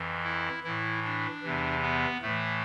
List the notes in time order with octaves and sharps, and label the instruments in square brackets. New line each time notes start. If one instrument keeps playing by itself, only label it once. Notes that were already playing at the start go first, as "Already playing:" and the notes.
Already playing: [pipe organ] F2 E3
E4
A2 E3 E4
D4
E2 C3 E3
B3
A2 A3
E3